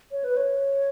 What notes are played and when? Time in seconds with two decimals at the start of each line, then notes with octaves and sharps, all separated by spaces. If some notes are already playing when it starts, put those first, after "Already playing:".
0.11 C#5
0.24 B4
0.37 C#5